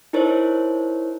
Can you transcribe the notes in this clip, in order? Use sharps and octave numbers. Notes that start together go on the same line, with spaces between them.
D#4 E4 A#4 C5 C#5